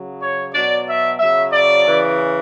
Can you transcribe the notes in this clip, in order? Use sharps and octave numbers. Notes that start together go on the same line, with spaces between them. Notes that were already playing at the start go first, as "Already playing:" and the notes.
Already playing: C#3 F#3
C#5
B2 F#3 D5
E5
C#3 F#3 E5
D5
C#3 E3